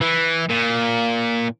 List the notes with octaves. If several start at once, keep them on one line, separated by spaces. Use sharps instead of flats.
E3
A#2